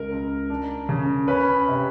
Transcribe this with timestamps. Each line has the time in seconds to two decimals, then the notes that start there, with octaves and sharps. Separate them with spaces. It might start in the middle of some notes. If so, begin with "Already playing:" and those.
Already playing: C#2 A#4
0.11 C#2
0.50 D4
0.89 C#3
1.28 C#4 B4
1.68 C3